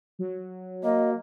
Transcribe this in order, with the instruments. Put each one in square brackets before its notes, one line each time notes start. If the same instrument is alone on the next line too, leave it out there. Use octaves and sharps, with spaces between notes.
[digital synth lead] F#3
[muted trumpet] A#3 [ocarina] D#5